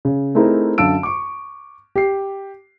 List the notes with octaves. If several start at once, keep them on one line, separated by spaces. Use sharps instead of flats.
C#3
A3 C4 D#4 E4 G#4 A#4
F#2 D3 F5 A5 E6 D7
C#6 D6
G4 C7